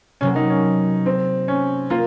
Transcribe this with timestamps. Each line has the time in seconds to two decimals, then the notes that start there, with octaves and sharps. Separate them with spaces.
0.21 C3 F#3 A#3 C#4
0.36 D#4
0.50 C#4
1.06 C4
1.48 C#4
1.90 A#3 F4